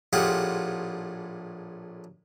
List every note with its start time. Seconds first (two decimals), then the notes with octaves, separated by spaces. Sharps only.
0.13 A#1 A2 F4 G4 G#4 F#5